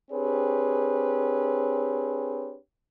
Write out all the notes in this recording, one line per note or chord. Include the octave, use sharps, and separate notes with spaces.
C4 D4 G4 G#4 B4 C#5